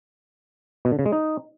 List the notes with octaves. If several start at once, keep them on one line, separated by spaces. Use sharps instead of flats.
B2
D3
C#3
G#3
D#4